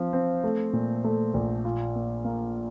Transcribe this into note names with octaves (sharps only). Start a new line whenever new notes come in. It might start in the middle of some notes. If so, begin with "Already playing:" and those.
Already playing: F3 C4
C4
A3
A#2
A3
A#1
F4
A#3
A#3